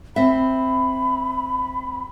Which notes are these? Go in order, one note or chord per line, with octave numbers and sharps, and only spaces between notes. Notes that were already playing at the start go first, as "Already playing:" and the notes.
C4 E5 B5